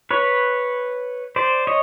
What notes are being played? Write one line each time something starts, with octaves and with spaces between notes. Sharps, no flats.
B4 C#5
C5 D5
C#5 D#5